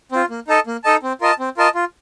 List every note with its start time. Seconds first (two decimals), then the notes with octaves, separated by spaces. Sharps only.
0.12 C4 F4
0.30 A#3
0.48 D#4 A4 D#5 A5
0.67 A#3
0.84 D#4 A4 D#5 A5
1.03 C4
1.21 F4 A#4 D#5 A5
1.39 C4
1.57 F4 A#4 D#5 A5
1.75 F4